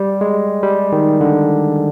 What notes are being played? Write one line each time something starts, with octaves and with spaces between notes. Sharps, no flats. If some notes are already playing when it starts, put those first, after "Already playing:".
Already playing: G3
G#3
G3
D#3
D3